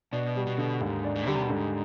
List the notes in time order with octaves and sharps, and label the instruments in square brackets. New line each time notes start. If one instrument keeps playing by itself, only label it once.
[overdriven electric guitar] B2 [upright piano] D4
[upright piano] G3
[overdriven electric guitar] B2
[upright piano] D3
[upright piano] D#2 [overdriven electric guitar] G#2
[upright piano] D4
[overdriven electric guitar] G#2
[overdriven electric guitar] D3 [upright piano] G3
[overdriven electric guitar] C3
B2
[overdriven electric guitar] G#2 [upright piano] D3